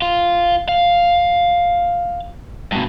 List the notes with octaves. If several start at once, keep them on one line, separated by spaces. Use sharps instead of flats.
F4
F5
G2 B2